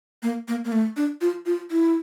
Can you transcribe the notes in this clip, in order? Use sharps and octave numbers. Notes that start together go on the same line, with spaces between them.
A#3
A#3
A#3
A3
D4
F4
F4
E4